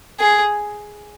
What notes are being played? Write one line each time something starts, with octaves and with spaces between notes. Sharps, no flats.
G#4